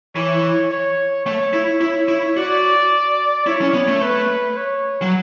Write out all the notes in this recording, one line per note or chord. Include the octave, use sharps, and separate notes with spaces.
E3 C#5
C#5
A3 C#5
E4
E4 C#5
E4
F#4 D5
E4 C#5
C#4
B3
A3
B4
C#5
F#3